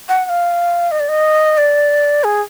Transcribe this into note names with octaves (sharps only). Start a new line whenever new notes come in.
F#5
F#5
F5
D#5
D5
D#5
D5
G#4